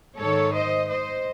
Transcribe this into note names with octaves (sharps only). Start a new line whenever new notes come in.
G#2 D#3 A4 C#5
C5 D#5
C5 D#5